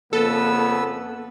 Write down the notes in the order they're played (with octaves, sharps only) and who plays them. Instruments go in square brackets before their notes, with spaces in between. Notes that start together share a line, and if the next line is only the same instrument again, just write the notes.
[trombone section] F2 C#3 B3 [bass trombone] A#3 [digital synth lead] A4 [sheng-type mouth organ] B4 E6